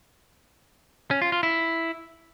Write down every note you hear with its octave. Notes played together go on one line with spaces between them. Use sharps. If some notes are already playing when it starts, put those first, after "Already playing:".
C#4
F4
F4
E4